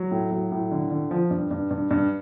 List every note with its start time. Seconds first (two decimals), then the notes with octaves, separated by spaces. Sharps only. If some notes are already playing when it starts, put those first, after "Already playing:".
Already playing: F#3
0.11 A2
0.31 F#3
0.52 A2
0.72 D3
0.92 D3
1.11 F3
1.31 G2
1.51 G2
1.71 G2
1.91 G2